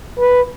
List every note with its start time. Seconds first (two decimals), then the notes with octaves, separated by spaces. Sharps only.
0.19 B4